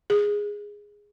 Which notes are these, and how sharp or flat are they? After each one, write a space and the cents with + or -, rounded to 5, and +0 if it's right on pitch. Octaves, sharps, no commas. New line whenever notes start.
G#4 -10